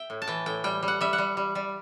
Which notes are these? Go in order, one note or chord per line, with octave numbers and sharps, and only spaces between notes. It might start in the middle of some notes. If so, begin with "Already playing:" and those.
Already playing: E5 G5
A2
A5
E3 G5
A2 G5
G3 G5
G3
F#5
G3 E5
F#5
G3
G3
G3